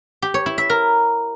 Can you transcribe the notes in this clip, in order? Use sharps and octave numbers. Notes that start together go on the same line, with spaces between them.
G4
C#5
E4
E5
A#4